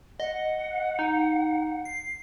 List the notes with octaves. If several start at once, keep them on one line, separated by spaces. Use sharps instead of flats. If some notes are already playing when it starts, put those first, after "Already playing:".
D#5 F#5
D#4
C7